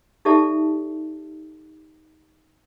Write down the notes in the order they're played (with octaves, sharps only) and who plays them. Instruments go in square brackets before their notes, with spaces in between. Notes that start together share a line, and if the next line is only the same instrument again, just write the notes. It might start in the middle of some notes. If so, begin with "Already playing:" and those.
[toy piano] D#4 G4 A4 D5 E5 A5